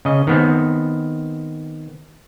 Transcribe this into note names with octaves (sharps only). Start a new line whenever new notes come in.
C#3 D#5
D#3 B3 C4